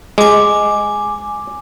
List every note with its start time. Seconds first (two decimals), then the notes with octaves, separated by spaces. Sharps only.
0.18 G#3 G#5 D6